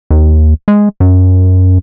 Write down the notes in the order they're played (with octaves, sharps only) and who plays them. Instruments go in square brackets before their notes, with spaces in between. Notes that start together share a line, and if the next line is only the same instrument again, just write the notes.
[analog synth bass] D#2
G#3
F#2